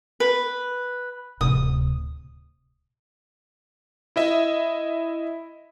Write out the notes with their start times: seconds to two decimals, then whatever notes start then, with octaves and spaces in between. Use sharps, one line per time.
0.20 B4
1.41 D1 C3 D#6
4.16 E4 D#5 E5